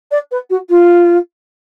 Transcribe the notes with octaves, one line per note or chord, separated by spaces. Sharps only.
D5
B4
F#4
F4